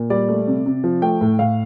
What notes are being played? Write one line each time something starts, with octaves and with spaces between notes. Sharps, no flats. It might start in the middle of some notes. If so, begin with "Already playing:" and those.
Already playing: A#2
G3 D5
A3
C3
C3
F3
A3 G5
A2
A2 F5